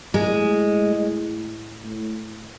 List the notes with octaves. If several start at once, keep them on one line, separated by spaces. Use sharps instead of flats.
A2 G#3
A2